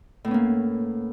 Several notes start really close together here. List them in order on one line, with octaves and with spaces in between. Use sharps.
A2 B3 C#4 A#3